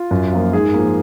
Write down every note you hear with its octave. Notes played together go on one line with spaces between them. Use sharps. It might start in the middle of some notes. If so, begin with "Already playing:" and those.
Already playing: F4
F#2
F3 A#3
G#2 G#4
F3 A#3